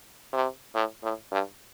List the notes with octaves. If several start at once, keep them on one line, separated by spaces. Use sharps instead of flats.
C3
A2
A2
G2